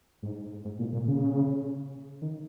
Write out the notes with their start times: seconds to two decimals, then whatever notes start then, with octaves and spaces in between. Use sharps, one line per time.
0.22 G#2
0.65 G#2
0.79 A#2
0.93 A#2
1.07 C#3
2.21 D#3